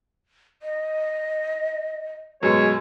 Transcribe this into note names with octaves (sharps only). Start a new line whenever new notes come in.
D#5
F#2 B2 G#3 C#5